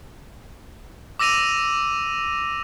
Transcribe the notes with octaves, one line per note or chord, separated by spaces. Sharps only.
D6 E6 A#6 D#7 F7